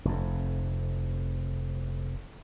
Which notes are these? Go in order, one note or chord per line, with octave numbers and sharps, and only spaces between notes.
F1 F2